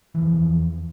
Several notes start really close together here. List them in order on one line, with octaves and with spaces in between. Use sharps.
E3 F3 E2